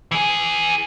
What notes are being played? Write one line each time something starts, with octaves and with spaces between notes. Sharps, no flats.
E3 G#4